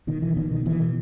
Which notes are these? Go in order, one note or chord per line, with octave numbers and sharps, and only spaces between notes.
B2 D#3
E3
B2 D#3
D#3
B2 E3